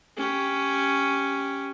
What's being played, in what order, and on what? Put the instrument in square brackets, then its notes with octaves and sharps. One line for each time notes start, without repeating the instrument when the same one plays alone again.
[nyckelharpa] C#4 G4